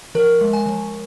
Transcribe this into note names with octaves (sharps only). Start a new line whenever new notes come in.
F3 A#4
G#3
G#5
F3